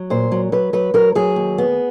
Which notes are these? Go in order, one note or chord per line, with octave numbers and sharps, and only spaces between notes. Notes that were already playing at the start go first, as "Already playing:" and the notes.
Already playing: F#3
A#2 C5
F#3
F#3 B4
F#3 B4
F#3 A#4
F#3 G#4
D#2
B3